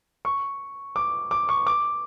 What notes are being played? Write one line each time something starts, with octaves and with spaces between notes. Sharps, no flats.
C#6
D6
D6
C#6
D6